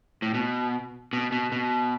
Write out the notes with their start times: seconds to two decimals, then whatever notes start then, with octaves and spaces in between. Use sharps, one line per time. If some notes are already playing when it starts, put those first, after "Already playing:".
0.22 A2
0.34 B2
1.13 B2
1.32 B2
1.52 B2